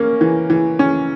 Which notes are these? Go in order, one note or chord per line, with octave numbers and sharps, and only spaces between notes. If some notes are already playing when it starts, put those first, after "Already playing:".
Already playing: A#3 C#4
E3
E3
C#4